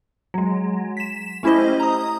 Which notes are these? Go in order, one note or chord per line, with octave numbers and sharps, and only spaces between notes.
F#3 G#3
B6 E7
A3 C#4 E4 G4 C5 D#5
A#5 D#6